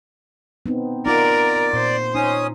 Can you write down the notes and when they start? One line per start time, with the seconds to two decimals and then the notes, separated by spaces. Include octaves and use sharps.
0.66 B3 C4 D#4
1.06 D#4 F4 A#4 D5 F#5
1.73 A#2 C5
2.15 C#4 D#4 D#6